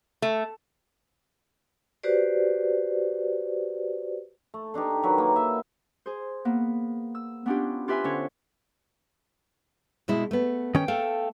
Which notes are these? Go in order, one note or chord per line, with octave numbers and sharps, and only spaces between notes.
A3
F#4 G4 B4 C5 D5
A3
A3 D4 D#4 G4
D#3 F#3 B4
A#3 E4
E5
G#4 C5
A#3 B3
E6
B3 C#4 D4 E4 F4 G4
F4 G4 B4 E5 G#5 C6
D3 C#4 A4 C5 C#5
B2 G#3 E4
A3 B3
D#3 C#4 G5
A3 A4 F5 G5